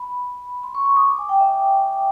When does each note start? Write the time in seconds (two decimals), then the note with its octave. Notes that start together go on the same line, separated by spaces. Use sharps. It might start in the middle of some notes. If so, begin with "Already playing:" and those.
Already playing: B5
0.63 C6
0.75 C#6
0.86 C#6
0.97 D#6
1.08 D6
1.18 G#5
1.29 G5
1.40 E5